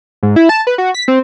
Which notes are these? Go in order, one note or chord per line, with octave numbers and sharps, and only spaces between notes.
G#2
E4
A5
B4
F#4
B6
C4